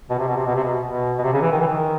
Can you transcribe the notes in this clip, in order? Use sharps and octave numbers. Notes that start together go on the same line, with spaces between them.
B2
C3
B2
C3
B2
C3
B2
B2
B2
C3
C#3
E3
D#3
E3
D#3